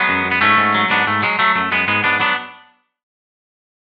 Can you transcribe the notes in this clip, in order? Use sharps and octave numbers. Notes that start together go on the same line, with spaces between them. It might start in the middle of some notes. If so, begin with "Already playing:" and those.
Already playing: F#3 G#3 B3
F#2
F#2
B3
G#2 A3 C#4
G#2
F#3
G#2 B3 D4
G#2 A3
F#3 G#3
F#3 A3
F#2 A3
F#2 G#3 B3
G#2 G#3 B3
G#2 B3 D4
F#3 B3 D4